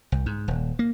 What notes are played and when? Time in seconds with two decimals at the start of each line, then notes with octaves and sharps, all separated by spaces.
0.12 C2
0.26 G#2
0.48 D#1
0.79 A#3